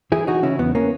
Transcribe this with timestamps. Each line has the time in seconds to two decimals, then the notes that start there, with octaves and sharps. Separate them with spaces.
0.12 E3 E4 G#4
0.27 E3 D#4 F#4
0.43 C#3 C#4 E4
0.59 E2 B3
0.75 A#3 C#4